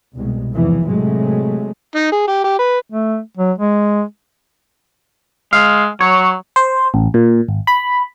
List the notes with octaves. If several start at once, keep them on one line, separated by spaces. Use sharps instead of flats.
C2 B2 G#3
F1 E2 G#2 E3 F3
A2 C3 F#3 G#3 A3
D#4
G#4
G4
G4
B4
A3
F#3
G#3
G#3 F5
F#3 C#5
C5
A1
A#2
G#1
B5